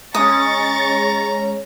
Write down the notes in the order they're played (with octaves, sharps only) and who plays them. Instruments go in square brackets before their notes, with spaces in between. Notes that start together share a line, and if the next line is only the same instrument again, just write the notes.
[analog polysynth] G#3 C#4 [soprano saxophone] A#5 [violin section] C#6 A6 [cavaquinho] D#6